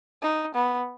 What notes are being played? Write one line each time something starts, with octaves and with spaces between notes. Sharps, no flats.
D#4
B3